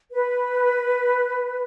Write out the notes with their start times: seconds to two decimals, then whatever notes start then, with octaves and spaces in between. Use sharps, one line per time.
0.12 B4